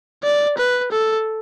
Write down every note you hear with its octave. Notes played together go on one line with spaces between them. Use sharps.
D5
B4
A4